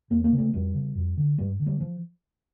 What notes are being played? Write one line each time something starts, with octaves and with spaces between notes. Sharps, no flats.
E2 A#3
A#3
C#3
A3
F2 G3
C#3
F2
D3
G2 G3
D3
G3
F3